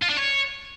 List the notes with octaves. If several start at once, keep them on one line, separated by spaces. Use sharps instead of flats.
F4
D4
C#5